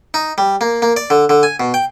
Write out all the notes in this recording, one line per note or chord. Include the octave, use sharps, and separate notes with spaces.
D#4
G3
A#3
A#3
D5
D3
D3
G#5
B2
G5